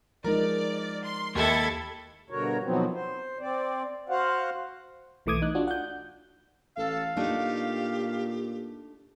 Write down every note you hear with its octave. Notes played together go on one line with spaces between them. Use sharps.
F3 G#3 D#4 A#4 D5
C6
D#2 A#3 E4 G4 A4 G#6
G2 B2 D3 F#4 A#4 C#5
B2 D#3 F3 F#3 B3 C4
C5
C4 D5
F#4 C5 F5 F#5
B1 E3 A3 D6 D#6 G#6
D#4 F#6
D4 F4 F#4
F#5 G6
A1 A4 F5
A#2 A3 D4 D#4 G4